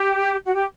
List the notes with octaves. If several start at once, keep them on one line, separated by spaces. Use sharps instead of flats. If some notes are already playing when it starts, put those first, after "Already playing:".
Already playing: G4
F#4
G4